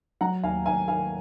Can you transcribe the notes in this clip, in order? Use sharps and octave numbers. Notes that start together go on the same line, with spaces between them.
F#3 F#5 A#5
D#2 F5 G#5
D#2 F5 G#5
D#3 F5 G#5